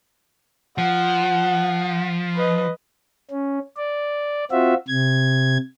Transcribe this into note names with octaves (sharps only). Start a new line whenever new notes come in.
F3 F#5
B4 D#5
C#4
D5
C4 F4 F#4 E5
C3 G#6